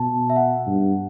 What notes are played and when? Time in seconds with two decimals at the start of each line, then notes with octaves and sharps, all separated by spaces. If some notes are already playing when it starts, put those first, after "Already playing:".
Already playing: B2 A5
0.30 E5
0.36 F#5
0.66 G2